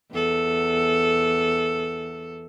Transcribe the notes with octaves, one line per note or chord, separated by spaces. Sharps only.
E2 A4